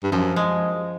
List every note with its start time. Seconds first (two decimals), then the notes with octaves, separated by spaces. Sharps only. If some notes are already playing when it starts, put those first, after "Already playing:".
0.04 G2
0.12 F#2 F3
0.36 G#3